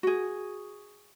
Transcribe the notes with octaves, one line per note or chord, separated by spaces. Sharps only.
F#4 G#4